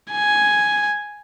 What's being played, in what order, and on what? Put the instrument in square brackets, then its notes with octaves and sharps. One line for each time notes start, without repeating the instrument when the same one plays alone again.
[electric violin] G#5